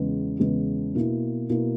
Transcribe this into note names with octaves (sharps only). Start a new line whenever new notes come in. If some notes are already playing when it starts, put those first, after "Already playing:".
Already playing: E2 C#3 G#3 B3
E2 C#3 G#3 B3
B2 A#3 E4
B2 A#3 E4